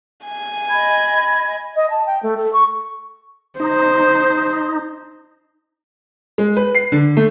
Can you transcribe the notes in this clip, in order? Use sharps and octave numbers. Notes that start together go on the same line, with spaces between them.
G#5
D#5 B5 G#6
D#5
A5
G5
A3
A4
C#6
D#4 C5
G#3
B4
C7
D3
A3